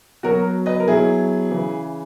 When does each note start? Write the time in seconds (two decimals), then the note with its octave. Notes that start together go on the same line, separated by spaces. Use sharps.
0.23 B2 F#3 F#4 A#4
0.66 B4 D#5
0.80 A#4
0.87 B2 F#3 E4 G#4
1.51 C#3 E3